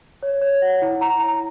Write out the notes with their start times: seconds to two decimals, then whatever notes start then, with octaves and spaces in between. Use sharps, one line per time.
0.23 C#5
0.42 C#5
0.62 F#5
0.82 E4
1.01 A#5
1.19 A#5